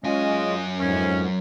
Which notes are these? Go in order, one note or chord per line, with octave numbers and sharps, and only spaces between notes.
F#2 G#3 C#4 F4 D#5 G#5
F2 G#2 C#4